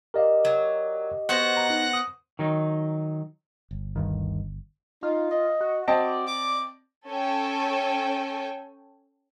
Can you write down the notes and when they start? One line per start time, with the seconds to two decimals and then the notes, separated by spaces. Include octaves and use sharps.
0.14 G4 A#4 D5 D#5 F5
0.45 F#3
1.29 B3 F#4 C5 F#5 F#6 A#6
1.57 A#5
1.70 D#4
1.93 D#6
2.39 D#3 F#3 D#4
3.71 G1
3.96 D2 G2 D#3
5.03 D#4 F4
5.31 D#5
5.61 F#4
5.88 C4 F#4 D5 D#5 A5
6.27 D6
7.11 C#4 A4 G5 G#5